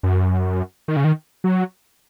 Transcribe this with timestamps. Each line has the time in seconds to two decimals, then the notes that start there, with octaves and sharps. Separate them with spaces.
0.03 F#2
0.88 D#3
0.97 C#3
1.04 D#3
1.44 F#3